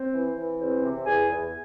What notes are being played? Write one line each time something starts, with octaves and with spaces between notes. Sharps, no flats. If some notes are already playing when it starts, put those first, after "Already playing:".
Already playing: C4 C5
E3
E3
E2 C4 C5
C3
E2 G#4 G#5
E2